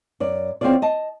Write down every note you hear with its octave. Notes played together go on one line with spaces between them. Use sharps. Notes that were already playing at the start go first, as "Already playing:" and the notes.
F#2 D5
E2 C4 C#4 F4 G#4 D5
D#5 A5